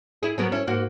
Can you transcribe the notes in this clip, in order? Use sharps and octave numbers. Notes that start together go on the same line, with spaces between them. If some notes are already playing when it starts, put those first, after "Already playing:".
E4 G#4
F#3 B3 A#4
C#4 E4
G#2 A#3 F#4